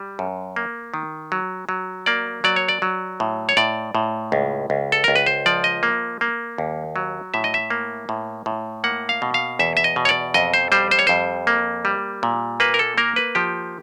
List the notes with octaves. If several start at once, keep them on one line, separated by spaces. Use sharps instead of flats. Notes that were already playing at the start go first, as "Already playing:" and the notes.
Already playing: G3
F#2
A#3
D#3
F#3
F#3
A#3 D5
F#3 D5
C#5
D5
F#3
A2
C#5
A2 D5
A2
C#2
C#2
A4
C#2 A#4
B4
C5
F3 D5
D#5
A#3
A#3
D#2
F#3
A2 E5
D#5
E5
A#3
A2
A2
A#3 F#5
F5
B2
F5
E2 E5
E5
D#5
B2
C#5
D5
F2 D#5
C5
G3 C5
C5
C#5
F2 C5
A#3
G3
A#2
A#3 B4
A#4
A4
A#3 A#4
B4
F3 G4